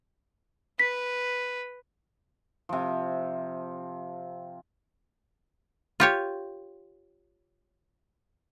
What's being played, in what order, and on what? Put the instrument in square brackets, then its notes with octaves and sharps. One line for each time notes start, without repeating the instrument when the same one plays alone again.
[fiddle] B4 [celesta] B6
[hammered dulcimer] C3 F3
[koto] F4 G4 C#5